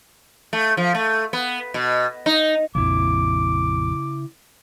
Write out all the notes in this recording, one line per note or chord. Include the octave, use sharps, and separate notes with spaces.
A3
F3
A3
B3
B2
D#4
A#1 F2 C#3 E4 D6